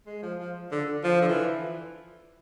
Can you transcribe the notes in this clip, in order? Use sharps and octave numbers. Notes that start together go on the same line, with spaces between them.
G#3
F3
F3
D3
F3
D3
E3